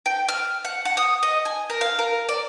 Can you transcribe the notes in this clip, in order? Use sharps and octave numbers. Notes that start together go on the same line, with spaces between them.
G5
F6
F#5
F#5
D#6
D#5
G#5
A#4
F5
A#4
D5